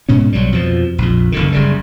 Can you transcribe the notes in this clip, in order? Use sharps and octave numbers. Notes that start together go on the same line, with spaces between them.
G#2 B2 C#4
B1 F#3 G3
F2 B2 F3
A#1 F2
F#1 D3 D#3
F#1 C#3 G3